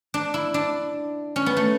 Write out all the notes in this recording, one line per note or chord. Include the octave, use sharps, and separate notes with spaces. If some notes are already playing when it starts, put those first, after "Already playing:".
D4
E4
D4
C#4
B3
A3